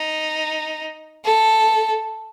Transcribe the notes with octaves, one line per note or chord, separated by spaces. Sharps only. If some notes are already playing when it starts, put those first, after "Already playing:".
Already playing: D#4
A4